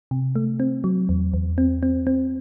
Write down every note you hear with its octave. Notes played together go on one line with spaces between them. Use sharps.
C3
A3
C4
F#3
E2
E2
C4
C4
C4